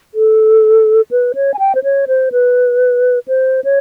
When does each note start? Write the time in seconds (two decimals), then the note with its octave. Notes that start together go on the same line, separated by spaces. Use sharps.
0.14 A4
1.11 B4
1.35 C#5
1.54 G#5
1.59 G5
1.75 C5
1.83 C#5
2.08 C5
2.32 B4
3.28 C5
3.64 C#5